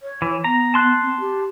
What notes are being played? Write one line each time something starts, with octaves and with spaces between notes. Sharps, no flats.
C#5
E3
B3 A#5
A5 C6 F#6
C4
G4